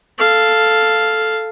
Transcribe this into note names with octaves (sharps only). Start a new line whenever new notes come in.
A4 F5